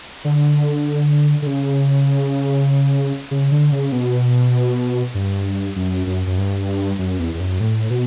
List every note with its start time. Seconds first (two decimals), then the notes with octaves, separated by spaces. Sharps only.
0.25 D3
1.42 D3
1.47 C#3
3.31 C#3
3.51 D3
3.72 C#3
3.92 B2
5.15 G2
5.76 F#2
6.07 F#2
6.27 F#2
6.38 G2
6.99 F#2
7.19 E2
7.35 E2
7.40 F#2
7.60 A2
7.90 B2